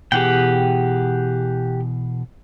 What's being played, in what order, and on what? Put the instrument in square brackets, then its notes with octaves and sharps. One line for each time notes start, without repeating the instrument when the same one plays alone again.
[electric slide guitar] B2 E3 G#4 [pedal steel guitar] G4 F#5 G5